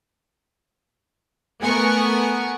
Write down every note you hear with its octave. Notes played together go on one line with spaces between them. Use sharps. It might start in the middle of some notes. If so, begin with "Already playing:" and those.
A3 B3 A#4 F#5 G#5 C#6